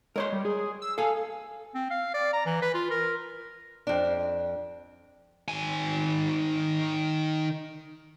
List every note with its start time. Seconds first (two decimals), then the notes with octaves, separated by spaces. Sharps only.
0.16 G#3 A#4 C#5 C6
0.33 G3
0.45 G#4
0.82 E6
0.98 A4 F5 G#5
1.75 C4
1.91 F5
2.14 D5
2.33 A#5
2.46 E3
2.62 B4
2.74 F4
2.91 A#4
3.87 F2 D4
5.48 D#3 G#5